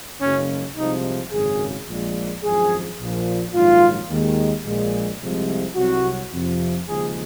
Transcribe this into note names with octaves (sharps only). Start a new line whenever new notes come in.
F#1 F#2 C#3 G#3 C#4
C2 C3 F3 G#3 D#4
G#1 F#2 C#3 G#4
A#1 A#2 G#3
G#1 F#2 F3 G#3 G#4
A#1 A#2 F3
A#1 G#2 D#3 F#3 F4
D#2 D#3 G#3
A#1 A#2 G#3
C2 C3 F3 G#3
C2 C3 F#3 F#4
F2 C3 F3
D#2 C#3 F3 G#3 G#4